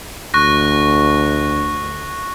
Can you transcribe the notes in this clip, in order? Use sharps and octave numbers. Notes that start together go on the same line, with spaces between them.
D2 C#6 F#6 A#6